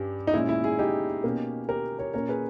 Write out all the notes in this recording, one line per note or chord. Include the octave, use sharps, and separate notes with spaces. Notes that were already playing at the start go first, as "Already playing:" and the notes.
Already playing: G2 G3 C#4 G4
D#4
A#2 G#3 C#4 E4
E4
E4 G#4
D#4 G4
B2 A#3 C#4
G4 A#4
A#4 C#5
A#2 A#3 C#4 A#4 C#5
G#4 B4